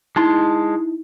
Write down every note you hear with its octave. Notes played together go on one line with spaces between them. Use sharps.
G#3 D#4 E4 A5 C6